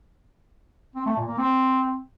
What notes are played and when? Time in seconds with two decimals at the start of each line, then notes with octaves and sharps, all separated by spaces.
0.95 C4
1.06 A3
1.17 A#2
1.27 A#3
1.38 C4